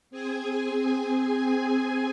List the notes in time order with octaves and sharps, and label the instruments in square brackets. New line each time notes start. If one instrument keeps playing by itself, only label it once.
[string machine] C4 G#4 G#5